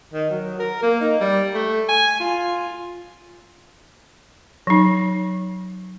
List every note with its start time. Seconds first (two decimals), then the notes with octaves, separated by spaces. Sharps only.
0.13 D#3
0.30 F#3
0.59 A#4
0.82 A#3
1.01 D#4
1.20 G3
1.54 A3
1.89 G#5
2.20 F4
4.67 F#3 D#4